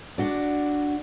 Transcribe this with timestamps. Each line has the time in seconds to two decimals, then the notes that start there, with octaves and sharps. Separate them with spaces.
0.18 D4 F#4 D5